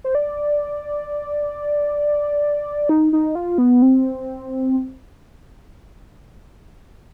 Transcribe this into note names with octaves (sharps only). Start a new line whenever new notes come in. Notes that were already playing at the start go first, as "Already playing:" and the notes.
C5
D5
D#4
D#4
F4
B3
C4